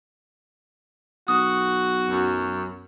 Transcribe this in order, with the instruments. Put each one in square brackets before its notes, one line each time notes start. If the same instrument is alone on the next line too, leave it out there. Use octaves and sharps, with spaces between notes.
[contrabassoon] B1 [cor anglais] F#4 [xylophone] D#6
[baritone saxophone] F#2